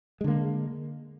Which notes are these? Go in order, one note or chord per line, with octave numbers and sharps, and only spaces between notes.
D3 G#3 A#3